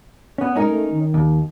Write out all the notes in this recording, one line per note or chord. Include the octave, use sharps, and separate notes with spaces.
B3 C#4
G#3 C#4 D#4 A#4
A3
D#3
D#2